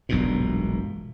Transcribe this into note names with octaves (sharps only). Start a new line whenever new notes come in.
E1 B1 G2 A#2